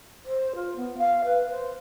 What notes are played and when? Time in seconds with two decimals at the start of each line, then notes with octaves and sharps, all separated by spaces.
0.25 C5
0.55 F4
0.76 B3
0.97 F5
1.24 B4
1.50 C5